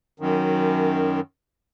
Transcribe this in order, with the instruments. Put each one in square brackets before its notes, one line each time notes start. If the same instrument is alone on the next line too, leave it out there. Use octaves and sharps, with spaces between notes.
[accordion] F#2 D#3